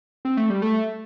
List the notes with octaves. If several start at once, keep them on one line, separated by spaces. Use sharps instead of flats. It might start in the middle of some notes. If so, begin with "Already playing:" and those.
C4
A3
G3
A3